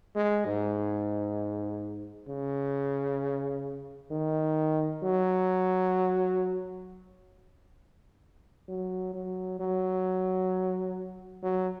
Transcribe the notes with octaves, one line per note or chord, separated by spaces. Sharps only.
G#3
G#2
C#3
D#3
F#3
F#3
F#3
F#3
F#3